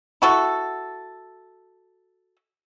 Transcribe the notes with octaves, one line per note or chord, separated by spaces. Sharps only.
E4 F#4 A4